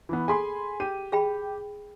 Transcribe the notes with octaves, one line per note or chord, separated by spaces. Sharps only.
E3 B3
G#4 A4 G#5 B5 C6
G4 D#7
G#4 G5 B5